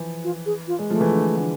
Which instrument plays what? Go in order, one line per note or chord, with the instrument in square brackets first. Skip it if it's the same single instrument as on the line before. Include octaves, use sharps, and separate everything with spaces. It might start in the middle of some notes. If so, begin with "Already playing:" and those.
Already playing: [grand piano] E3 F3
[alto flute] F4
G#4
F4
[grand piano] G#3
[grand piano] F3 [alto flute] A3
[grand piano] E3
D3
D3